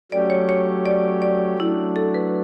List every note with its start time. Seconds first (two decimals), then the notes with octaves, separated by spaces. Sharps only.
0.12 F#3 A3 C#4 G4 D5
0.30 C#5
0.49 C#5
0.86 D5
1.22 D5
1.59 F#3 A3 D4 E4
1.96 A4
2.14 B4